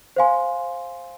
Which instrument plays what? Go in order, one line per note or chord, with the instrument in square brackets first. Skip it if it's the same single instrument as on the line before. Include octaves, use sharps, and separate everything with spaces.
[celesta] C5 F5 G#5 C6